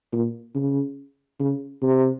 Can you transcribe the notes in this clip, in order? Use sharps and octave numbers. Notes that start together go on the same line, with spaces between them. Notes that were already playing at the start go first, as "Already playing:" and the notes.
A#2
C#3
C#3
C3